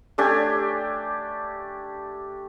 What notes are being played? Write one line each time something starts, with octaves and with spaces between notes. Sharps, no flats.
A3 D4 G4 G#5